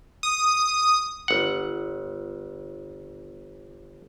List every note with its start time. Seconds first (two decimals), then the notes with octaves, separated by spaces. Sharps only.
0.23 D#6
1.28 G1 F#5